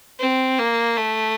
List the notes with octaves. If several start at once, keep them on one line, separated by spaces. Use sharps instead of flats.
C4
A#3
A3